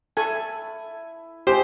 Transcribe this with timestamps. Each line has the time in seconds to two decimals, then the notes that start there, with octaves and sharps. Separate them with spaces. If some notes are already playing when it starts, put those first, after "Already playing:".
0.17 E4 A4 G#5
1.47 G#3 C4 F4 G4 C5